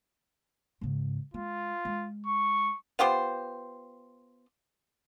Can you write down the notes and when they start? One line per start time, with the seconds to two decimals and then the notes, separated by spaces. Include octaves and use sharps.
0.81 G#2 C#3
1.34 G#3 F4
1.85 G#3
2.27 C#6
2.99 B3 F4 G4 C5